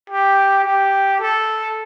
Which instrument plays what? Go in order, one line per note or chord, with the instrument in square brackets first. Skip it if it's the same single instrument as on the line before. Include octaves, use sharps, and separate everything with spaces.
[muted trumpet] G4
G4
A4